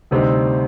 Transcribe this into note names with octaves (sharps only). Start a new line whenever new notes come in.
D2 C3 G3 C4 D#4